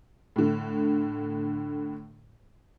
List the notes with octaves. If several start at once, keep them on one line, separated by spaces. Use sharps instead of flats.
A2 D3